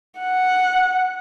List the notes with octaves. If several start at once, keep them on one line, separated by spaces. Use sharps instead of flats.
F#5